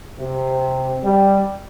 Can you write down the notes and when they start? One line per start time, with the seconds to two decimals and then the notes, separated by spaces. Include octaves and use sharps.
0.19 C3
1.04 G3